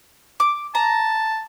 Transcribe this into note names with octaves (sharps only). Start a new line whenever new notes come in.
D6
A5 A#5